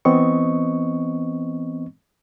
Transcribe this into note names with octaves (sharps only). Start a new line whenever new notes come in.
E3 B3 C4 D#5 C#6